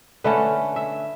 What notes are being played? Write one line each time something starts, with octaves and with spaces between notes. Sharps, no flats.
D3 A3 C#4 B4
E5